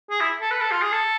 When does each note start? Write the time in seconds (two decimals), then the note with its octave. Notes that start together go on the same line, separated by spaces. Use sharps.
0.10 G#4
0.21 E4
0.41 A4
0.51 B4
0.61 A4
0.72 F4
0.82 G#4
0.92 A4